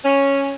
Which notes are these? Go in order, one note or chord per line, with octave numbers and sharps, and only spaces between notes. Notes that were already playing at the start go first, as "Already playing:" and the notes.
C#4